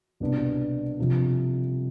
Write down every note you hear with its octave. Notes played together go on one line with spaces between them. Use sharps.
C2 B2 G3 B3 D4
F2 C3 F3